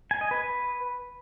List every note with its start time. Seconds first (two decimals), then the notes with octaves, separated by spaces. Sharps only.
0.11 G#5
0.21 D#5
0.31 B4